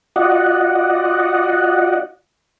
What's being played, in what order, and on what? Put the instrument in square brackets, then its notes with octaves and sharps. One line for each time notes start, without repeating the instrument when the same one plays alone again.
[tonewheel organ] F4 F#4 D5 D#5 F#5